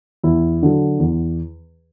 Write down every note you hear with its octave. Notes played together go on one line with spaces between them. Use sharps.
E2 E4
D3 F#3
E2